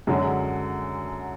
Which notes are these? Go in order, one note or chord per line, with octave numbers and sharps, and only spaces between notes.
F#2 D3 F#3 G#3